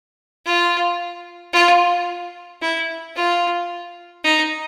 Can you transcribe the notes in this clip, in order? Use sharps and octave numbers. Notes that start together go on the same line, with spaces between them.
F4
F4
E4
F4
D#4